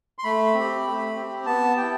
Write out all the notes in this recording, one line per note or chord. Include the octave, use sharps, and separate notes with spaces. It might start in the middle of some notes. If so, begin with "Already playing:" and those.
C6
A3 B5
C4
G4
A3
C4 G4
B3 A5
E4 G4 G5